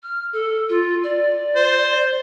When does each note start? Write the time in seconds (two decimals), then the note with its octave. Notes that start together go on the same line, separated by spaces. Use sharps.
0.03 F6
0.33 A4
0.69 F4
1.03 D5
1.56 C5